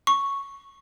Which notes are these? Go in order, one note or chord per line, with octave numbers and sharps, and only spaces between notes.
C#6